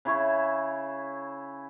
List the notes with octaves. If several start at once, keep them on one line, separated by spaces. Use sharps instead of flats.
C#3 E4 C#5 C#6